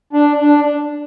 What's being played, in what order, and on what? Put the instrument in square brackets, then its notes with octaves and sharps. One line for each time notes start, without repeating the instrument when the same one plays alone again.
[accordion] D4
D4